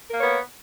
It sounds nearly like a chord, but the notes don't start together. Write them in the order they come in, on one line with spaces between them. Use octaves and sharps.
A#4 A#3 C#5 B3